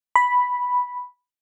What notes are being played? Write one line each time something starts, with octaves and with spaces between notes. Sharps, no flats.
B5